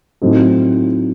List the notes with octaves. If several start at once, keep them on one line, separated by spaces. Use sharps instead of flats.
A2 F#3 C4 D#4 A4